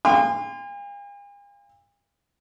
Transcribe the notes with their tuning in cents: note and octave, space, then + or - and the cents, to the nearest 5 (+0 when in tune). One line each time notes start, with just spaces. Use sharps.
F5 +0 G#5 -45 C6 -30